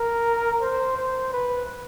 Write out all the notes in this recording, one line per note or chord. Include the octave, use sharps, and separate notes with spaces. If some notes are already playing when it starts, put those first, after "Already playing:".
Already playing: A#4
C5
C5
B4